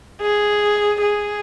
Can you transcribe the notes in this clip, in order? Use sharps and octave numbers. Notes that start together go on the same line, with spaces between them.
G#4
G#4